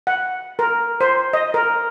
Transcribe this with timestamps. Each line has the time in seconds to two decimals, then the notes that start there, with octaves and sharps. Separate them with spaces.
0.07 F#5
0.59 A#4
1.01 C5
1.33 D#5
1.54 A#4